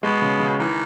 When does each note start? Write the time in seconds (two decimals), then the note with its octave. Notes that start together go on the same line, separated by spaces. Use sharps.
0.03 B2 G#3
0.22 C#3
0.40 C#3
0.59 D#3 E3